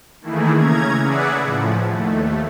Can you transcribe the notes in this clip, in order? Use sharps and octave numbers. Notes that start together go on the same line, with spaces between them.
D#3 E3 A3 A#3 E4 G#4
C#3 C#4 A#5 G#6
G#4 B4 D5 E5 F#5
A2 F3
D#2 A3